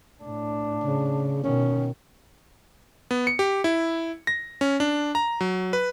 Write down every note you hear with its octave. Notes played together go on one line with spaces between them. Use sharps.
A2 D4
C#3
B2 D#3 C#4
B3
C#7
G4
E4
A#6
C#4
D4
A#5
F#3
B4